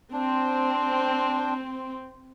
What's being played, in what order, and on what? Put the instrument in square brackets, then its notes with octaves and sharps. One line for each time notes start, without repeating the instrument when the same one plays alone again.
[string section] C4 [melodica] D4